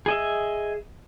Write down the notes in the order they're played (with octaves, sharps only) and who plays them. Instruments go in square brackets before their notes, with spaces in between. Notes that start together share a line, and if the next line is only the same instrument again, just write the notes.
[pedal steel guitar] G#4 D#5 E5